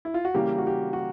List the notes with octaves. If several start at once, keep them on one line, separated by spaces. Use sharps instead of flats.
E4
F4
F#4
C#3 E3 G3 A#3 G4
F#4
G4
F#4